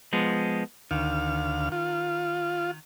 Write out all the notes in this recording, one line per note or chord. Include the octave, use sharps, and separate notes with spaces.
F3 G#3 B3
D2 D#3 F5
F4